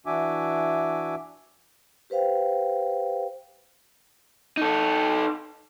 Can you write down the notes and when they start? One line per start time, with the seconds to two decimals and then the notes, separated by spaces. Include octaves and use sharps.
0.06 E3 D4 F#4 E5 G#5 D6
2.10 G4 B4 C5 F5 G5
4.57 D#4 A4